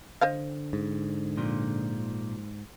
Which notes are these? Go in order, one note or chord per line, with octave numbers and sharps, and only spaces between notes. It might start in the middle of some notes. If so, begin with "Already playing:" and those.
D3 C5 D#5 F5
G#2
A#2 F3